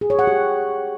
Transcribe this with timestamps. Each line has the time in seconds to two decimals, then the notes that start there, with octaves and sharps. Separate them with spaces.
0.01 G#4
0.10 C#5
0.19 F#5
0.27 G4